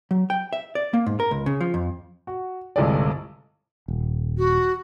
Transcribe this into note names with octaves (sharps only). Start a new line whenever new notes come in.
F#3
G5
E5
D5
A#3
G#2
A#4
C#2
C#3
F3
F2
F#4
G1 C2 G#3 A3 G#4 D5
D#1
F#4